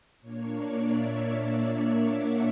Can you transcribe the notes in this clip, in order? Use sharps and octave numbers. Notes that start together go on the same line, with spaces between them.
A#2 A#3 D4 C#5
D5
E5
F#5